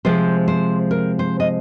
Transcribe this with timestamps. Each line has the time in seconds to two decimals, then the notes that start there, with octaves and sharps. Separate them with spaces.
0.05 C3 F3 G#3 C5
0.48 C5
0.91 A#4
1.19 C5
1.40 D#5